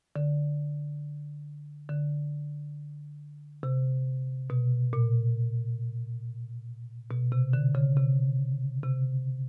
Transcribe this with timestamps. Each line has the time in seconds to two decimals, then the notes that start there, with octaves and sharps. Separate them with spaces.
0.16 D3
1.89 D3
3.63 C3
4.50 B2
4.93 A#2
7.11 B2
7.32 C3
7.53 D3
7.75 C#3
7.97 C3
8.83 C3